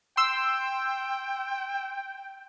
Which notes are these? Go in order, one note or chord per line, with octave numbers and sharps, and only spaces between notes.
G5 C6 E6